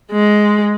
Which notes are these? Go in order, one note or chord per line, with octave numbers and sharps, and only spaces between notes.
G#3